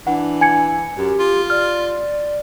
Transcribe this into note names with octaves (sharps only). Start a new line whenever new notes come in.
E3 D4 F#5
G#5 G#6 C#7
F#2 G4
F4
D5 F6